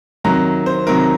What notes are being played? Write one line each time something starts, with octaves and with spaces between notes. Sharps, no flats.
C3 D#3 F#3 A#5
C5
C3 D#3 F#3 A#4